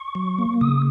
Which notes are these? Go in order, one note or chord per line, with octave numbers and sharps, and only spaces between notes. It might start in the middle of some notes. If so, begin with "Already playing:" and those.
Already playing: C#6
F#3
A#3
C#3 D#6